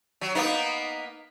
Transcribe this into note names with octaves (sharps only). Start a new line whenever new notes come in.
F#3
A#3 B3 D#4